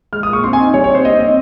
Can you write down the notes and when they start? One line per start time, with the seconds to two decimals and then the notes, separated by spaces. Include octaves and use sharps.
0.13 G#3 F6
0.23 D#6
0.28 A#2 C#6
0.44 C4 C6
0.53 G#5
0.60 D#4
0.74 G3 C#5
0.84 C#5
0.90 C4 C5
1.05 C4 D#5
1.20 C4 D#5